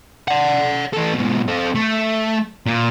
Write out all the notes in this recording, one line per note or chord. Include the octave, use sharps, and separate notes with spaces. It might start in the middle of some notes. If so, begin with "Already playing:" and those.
D5 F#5
E3 A4
G#2 B2
C4 A4
A3
A#2